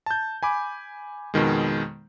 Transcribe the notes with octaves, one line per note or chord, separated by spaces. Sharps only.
A5 G6
G#5 B5 D6
F2 B2 D#3 G#3